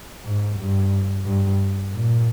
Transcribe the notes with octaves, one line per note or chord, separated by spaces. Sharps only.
G#2
G2
G2
A#2